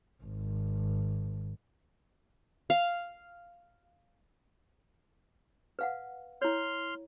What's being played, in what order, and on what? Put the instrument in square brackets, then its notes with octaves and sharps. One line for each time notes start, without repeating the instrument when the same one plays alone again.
[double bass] G#1
[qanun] F5
[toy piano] B4 F5 F#5
[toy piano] E4 C#5 [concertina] C6 F6